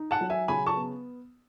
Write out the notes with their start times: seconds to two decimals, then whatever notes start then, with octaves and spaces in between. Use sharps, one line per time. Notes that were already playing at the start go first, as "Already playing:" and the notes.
Already playing: D#4
0.11 F#5 A5
0.21 F#3
0.30 E5 G#5
0.48 C#3 G#5 B5
0.66 A5 C#6
0.76 B3